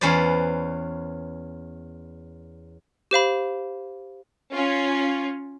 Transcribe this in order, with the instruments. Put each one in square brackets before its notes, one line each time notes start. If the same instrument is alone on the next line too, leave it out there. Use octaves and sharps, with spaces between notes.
[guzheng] E2 C#4 B4 C5 D5
[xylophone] G4 C5 F5 B5
[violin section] C#4 F4